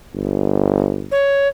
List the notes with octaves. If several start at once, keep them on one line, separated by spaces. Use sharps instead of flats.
G1
C#5